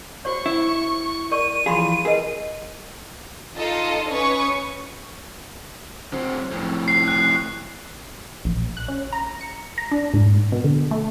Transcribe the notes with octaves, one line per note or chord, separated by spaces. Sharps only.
F#4 C5 C#5 C#6
E4
A#4 D5 C#6 D#7
E3 F3 G#4 F5 B5 C6
G#4 A#4 B4 D#5
D#4 F4 A4 D#5
C#4 B4 C#5 C#6 D#6
F#3 C4
F2 A2
F#6 C7
F#6
A#1
F#6
C#4
A#5
C#7
A#5
D4
G#2
B2
D3
A3